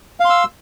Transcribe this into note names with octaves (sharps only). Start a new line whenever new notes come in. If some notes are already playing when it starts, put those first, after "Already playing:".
F5 C6 E6